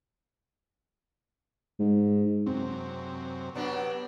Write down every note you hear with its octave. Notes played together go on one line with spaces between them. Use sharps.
G#2
F#2 C3 C4
C3 F#3 B3 D4